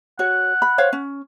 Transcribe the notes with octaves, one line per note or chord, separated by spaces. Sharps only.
F#4 C#5 F#5
B5
C5 C#5 F5
C#4